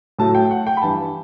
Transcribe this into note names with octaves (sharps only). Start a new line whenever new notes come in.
A2 F#3 A3 A5
G5
F#5
G5
B5
G2 E3 G3 A5